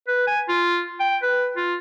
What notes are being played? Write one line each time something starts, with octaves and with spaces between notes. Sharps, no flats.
B4
G#5
F4
G5
B4
F4